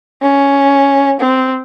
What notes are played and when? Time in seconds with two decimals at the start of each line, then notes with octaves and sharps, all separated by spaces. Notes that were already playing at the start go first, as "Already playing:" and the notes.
0.22 C#4
1.20 C4